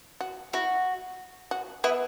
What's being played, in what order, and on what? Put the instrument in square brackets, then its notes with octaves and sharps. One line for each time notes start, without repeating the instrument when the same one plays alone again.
[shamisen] F#4
[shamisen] E4 [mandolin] F#4
[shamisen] F#4
[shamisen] B3 [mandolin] E4